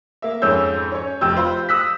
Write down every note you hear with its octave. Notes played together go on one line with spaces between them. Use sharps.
A#3 E5
F2 G#2 C#4 E6 G6
C#4 C#5
F1 G4 E6 G6
F4 C5 B5
D#6 E6 F#6 B6